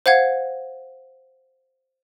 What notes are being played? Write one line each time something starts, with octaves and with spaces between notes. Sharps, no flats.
C5 F5 F#5 G#6